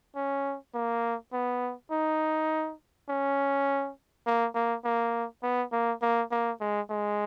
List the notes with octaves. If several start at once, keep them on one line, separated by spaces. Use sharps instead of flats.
C#4
A#3
B3
D#4
C#4
A#3
A#3
A#3
B3
A#3
A#3
A#3
G#3
G#3